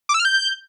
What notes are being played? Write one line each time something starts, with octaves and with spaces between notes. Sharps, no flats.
D6
E6
F6
G6